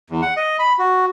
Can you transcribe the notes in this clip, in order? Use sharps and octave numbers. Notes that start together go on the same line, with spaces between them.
E2
F#5
D#5
B5
F#4